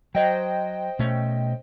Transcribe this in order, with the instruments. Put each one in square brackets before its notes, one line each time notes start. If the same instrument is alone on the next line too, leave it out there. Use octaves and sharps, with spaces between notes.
[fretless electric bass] F#3 [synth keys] C5 D#5 G5
[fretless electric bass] B2 A3 C#4